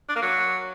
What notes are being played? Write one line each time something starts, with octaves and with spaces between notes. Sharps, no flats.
D4
A#3
F#3